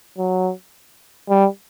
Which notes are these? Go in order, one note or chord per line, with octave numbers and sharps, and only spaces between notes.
F#3
G3